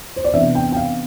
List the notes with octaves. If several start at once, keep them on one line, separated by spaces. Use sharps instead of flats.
C5
D5
C3 E3 B3 D4 E5
G5
G5
F5